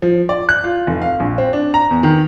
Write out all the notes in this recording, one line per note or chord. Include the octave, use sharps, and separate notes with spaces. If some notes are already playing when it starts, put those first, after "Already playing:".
F3
D5
F#6
F4
F1
F5
A#1
C4
D4
A#5
E2
D#3